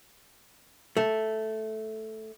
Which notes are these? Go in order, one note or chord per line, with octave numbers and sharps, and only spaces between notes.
A3